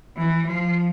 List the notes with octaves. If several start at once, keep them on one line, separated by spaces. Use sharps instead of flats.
E3
F3